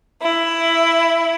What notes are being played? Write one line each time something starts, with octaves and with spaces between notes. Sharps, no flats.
E4